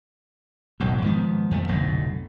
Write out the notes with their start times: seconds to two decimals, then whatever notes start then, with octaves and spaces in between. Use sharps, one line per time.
0.80 E1 B1 F#2 A2
1.02 G#2 D#3 F3 B3
1.51 F2 D#3 A3
1.68 F1 B1 A2 D3